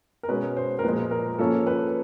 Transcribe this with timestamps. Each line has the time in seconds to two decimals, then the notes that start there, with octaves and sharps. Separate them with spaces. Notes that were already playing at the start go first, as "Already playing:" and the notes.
0.23 A#4
0.28 B2 G#3 C#4 B4
0.57 C5
0.79 A#4
0.84 A#2 F3 G#3 B4
1.11 A#4
1.39 F3 A#3 C#4 A4
1.67 B4